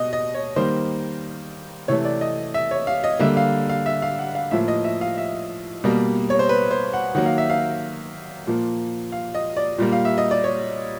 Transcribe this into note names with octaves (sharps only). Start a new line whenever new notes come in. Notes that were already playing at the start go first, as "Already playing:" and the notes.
Already playing: B2 D#5
D#5
C#5
D#3 G3 A#3 C5
C3 E3 A3 C#5
D5
D#5
E5
C#5
F5
D#5
D3 G3 A#3 E5
F5
F5
E5
F5
F#5
F5
A2 F3 A#3 E5
D#5
E5
F5
E5
B2 G3 A#3
C#5
C5
B4
C5
F#5
D#3 F#3 A#3 F#5
F5
E5
F5
A#2 F3 A#3
F5
D#5
D5
A#2 G3 A#3
F5
E5
D#5
D5
C#5